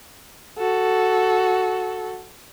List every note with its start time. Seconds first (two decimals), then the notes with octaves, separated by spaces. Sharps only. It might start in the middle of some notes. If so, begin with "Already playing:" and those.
0.58 F#4 A4